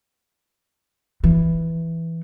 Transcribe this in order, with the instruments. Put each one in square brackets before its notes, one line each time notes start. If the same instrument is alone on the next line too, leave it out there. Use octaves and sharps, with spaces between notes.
[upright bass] E3